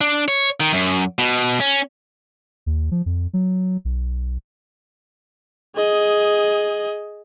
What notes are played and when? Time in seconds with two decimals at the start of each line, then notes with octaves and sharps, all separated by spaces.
0.01 D4
0.28 C#5
0.60 D#3
0.73 F#2
1.18 B2
1.60 C#4
2.66 D#2
2.91 F3
3.06 F2
3.33 F#3
3.85 B1
5.75 G#4 D#5